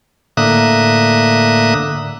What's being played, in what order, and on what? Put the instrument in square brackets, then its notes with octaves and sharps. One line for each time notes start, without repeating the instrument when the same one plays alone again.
[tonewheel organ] A2 D3 A#3 E5 D#6 F#6